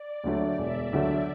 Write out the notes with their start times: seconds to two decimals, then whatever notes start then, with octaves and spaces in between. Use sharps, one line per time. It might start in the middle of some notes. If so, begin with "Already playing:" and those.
Already playing: D5
0.24 D2 D3 F#3 A3
0.58 E1 E5
0.93 D2 D3 F#3 A3